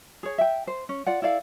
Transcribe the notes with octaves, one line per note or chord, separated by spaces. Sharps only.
G#4 C#5
E5 G5
C5
C#4
F4 D5 F#5
E4 A4 D5 F5